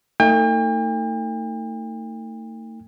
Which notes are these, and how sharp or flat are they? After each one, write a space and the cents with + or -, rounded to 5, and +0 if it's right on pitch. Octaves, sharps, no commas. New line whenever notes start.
A3 +45 D#4 +25 G5 +40